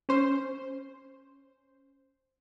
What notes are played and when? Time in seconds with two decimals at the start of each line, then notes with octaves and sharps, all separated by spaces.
0.09 C#4 C5